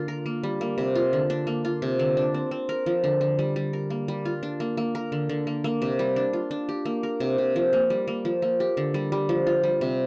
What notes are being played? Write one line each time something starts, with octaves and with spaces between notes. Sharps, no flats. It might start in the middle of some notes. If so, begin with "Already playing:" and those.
Already playing: D3 A#3 F4
A#4
A#3
G3
A#3
C3
F4
D3
D4
A#3
F4
C3
D3
D4
C4
C4
A#4
F3
D3
D3
G3
G3
A#4
A#3
G3
F4
D4
A#3
A#3
A#4
D3
D3
A#3
A#3
C3
G3
D4
F4
D4
G4
A#3
A#4
C3
C3
F3
A#3
G3
A#3
F3
A#3
G4
D3
G3
G3
F3
F4
G3
C3